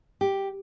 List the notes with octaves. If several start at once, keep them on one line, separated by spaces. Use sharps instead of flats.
G4